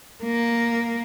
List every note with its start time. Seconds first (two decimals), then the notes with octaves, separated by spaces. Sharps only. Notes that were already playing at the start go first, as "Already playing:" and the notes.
0.24 A#3